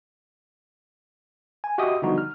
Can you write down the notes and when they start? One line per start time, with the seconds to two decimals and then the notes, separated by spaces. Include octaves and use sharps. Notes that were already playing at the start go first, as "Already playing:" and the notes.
1.64 G#5
1.78 F#4 G4 D#5 E5 G5 D#6
2.02 D3 F3 G3 B3 D#4 F#4
2.18 F6